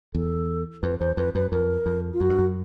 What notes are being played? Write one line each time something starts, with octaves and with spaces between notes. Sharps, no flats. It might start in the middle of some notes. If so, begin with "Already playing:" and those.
E2 A4
F2 B4
E2 C5
F2 B4
F#2 B4
F2 A#4
F2
F4
F#2 F#4
G2
F#2